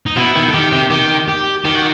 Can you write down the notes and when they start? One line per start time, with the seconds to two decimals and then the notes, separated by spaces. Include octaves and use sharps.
0.06 D#4
0.17 B2 E4
0.36 D#3
0.50 A4
0.54 D#3 G4
0.72 C3
0.91 D#3 G4
1.28 G4
1.65 D#3 G4
1.75 F#4